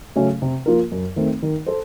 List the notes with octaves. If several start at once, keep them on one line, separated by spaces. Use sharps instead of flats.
C#3 F#3 A3 C#4
C3
F3 A#3 F4 A#4
F#2
D#3 A3 C4
D#3
A4 C5